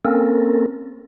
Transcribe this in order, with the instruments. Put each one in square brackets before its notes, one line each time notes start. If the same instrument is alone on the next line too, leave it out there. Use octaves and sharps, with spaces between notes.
[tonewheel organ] A#3 C4 C#4 A4 A#4